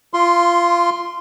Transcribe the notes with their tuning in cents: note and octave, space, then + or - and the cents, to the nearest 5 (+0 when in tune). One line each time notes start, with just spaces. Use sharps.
F4 -20 C6 +0